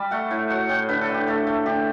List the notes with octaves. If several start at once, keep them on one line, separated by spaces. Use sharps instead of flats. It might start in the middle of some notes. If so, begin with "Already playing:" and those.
Already playing: G3 A5
A3 F#5
A2
F#3 F#5
A2 G5
D3 B4
A4
D3
G4
A3 A4
A3
D3 G4